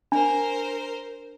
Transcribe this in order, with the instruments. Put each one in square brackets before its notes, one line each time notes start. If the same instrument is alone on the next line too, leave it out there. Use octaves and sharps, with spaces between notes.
[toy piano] D4 [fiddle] A#4 C5